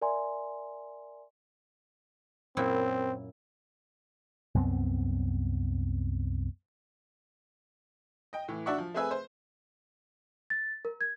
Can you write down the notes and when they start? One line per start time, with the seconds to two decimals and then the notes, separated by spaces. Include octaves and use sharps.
0.01 A#4 D5 E5 G#5 A#5 C6
2.57 F#2 A#2 C4 E4
4.54 C2 F#2 B3 C4
8.33 D#5 G5
8.48 A2 E3
8.66 D4 F#4 D5 E5 F#5 C#6
8.78 F3
8.94 A3 C4 G#4 B4 E5 G#5
9.11 C5
10.50 A6
10.85 A#4
11.01 G#6